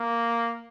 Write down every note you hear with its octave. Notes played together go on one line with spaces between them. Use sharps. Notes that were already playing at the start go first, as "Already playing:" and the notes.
Already playing: A#3